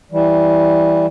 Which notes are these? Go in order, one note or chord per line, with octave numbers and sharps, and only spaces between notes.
E3 G3